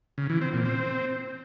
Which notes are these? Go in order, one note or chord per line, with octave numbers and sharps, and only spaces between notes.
C#3
E3
C4
A#2
C4